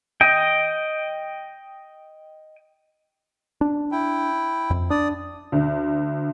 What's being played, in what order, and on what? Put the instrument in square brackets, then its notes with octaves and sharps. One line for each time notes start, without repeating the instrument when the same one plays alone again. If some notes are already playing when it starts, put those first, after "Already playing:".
[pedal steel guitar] D#5 G5
[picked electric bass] D4
[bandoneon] E4 G5
[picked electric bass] F2
[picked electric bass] D4 [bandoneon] D5 D#6
[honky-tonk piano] D2